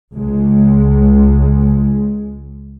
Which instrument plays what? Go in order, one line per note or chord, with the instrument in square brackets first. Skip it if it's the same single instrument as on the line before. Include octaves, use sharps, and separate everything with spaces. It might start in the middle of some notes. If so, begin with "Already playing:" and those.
[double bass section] C#2 G#3